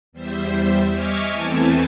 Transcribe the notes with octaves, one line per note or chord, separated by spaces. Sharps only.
E2 G3 C5 E5
D#5 E5 G#5 C#6 D6 F6
E2 E3 A3 C4 G#5 A5